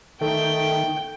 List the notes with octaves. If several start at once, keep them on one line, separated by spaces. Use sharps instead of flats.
D#3 A3 G5